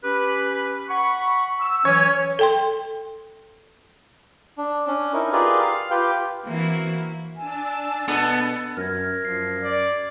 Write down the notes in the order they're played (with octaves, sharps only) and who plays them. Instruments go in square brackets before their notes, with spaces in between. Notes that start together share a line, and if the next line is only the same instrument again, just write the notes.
[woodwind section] C#4 G4 B4
F#5 B5 C#6
E6
[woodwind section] E3 F#3 C#4 [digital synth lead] C#5
[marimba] A4 G5 C6
[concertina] D4
C#4 D4
D#4 E4 A#4
F4 G4 G#4 A#4 B4 D5
F5
F4 G4 B4 G5
[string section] E3 A#3 C4 E4 F#4
[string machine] D4 A5 E6 [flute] G#5
[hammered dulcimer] B2 A4 [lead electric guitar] B3
[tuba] F#2 [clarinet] A#4 [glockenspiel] F6 G#6
[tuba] F#2 [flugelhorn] F3 [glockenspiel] C7
[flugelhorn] D5